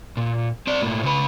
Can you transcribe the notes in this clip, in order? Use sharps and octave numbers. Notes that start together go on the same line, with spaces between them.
A#2
C4 D5
A2 A#3
C#3 B4